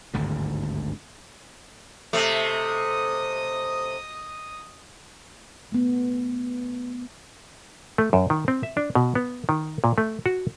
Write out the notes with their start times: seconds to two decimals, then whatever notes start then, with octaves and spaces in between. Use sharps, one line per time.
0.14 G#1 D2 G2 D3
2.13 C3 A3 D#5 D#6
5.72 A3 B3
7.98 A3
8.13 F#2
8.30 D#3
8.48 C4
8.63 E5
8.77 D4
8.95 B2
9.15 B3
9.49 D#3
9.84 A#2
9.98 A3
10.26 F#4